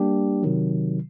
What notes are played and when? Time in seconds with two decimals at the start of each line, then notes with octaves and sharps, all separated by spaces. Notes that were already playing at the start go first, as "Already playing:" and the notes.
Already playing: G3 A#3 D4 G4
0.43 C3 D#3 F#3